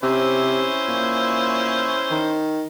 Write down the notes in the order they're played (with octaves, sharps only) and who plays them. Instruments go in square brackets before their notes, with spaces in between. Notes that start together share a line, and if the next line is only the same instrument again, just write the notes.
[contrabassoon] C3 [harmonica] C#4 E4 C5
[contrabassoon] A#2
D#3